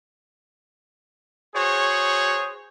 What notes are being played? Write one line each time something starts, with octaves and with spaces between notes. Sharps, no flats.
F#4 G#4 C5 C#5